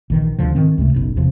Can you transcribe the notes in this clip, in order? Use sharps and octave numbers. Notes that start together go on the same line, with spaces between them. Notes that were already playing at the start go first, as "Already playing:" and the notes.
A#1 D#3 E3
D2 D3 F3
G#2 D#3 C4
C#2 C3 A3
F#1 B1
E2 C3 F3